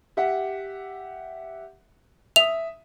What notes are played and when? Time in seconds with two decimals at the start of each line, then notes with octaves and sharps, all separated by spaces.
0.17 G4 E5 F#5
2.36 E5 D#6 F7